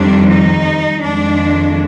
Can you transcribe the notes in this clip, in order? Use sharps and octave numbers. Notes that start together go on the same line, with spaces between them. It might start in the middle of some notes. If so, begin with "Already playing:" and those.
Already playing: F2 D#3 G3 D4
D#4
F2 D#3 G#3 D4